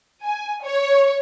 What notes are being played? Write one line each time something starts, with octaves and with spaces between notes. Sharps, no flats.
G#5
C#5